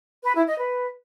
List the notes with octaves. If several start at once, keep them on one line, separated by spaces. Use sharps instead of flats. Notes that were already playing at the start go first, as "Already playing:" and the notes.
B4
E4
D#5
B4